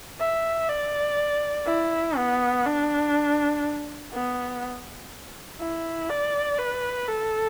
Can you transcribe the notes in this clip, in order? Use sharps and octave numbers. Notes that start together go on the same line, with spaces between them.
E5
D5
E4
B3
D4
B3
E4
D5
B4
A4